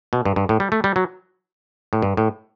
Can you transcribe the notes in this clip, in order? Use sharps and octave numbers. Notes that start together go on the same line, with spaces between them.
B2
G2
G2
A2
G3
A3
G3
F#3
A2
G2
A2